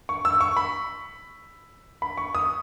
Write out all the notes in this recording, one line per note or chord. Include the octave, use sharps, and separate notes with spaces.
C#6
E6
C#6
B5
B5
C#6
D#6